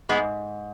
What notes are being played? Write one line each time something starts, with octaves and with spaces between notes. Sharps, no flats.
G#2 G#3 B3